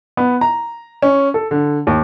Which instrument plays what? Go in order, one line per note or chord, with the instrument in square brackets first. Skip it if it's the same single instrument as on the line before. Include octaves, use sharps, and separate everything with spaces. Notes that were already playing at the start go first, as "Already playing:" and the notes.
[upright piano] B3
A#5
C#4
A4
D3
D#2